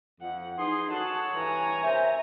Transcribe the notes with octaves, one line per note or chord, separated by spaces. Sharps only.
F2 F#5
E3 D#4 G#4 C6
F#4 G#4 A4 C#5 A5 F#6
G2 E3 G#5 A#5
C3 A#4 C5 E5